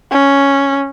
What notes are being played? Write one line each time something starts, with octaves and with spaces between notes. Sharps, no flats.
C#4